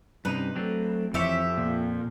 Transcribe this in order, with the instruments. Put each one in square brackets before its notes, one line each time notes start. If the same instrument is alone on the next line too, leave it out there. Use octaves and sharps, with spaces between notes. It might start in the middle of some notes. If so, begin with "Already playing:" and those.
[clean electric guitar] G2 C3 D#4 [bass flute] C#4 [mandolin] B4
[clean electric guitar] F#3 C4 D4 [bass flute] A3
[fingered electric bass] F2 [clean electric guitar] E3 C#5 [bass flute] C4 [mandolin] G4 C5 E5
[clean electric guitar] A#2 [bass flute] A#3